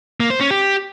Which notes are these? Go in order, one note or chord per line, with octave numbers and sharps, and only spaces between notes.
A#3
C5
C#4
G4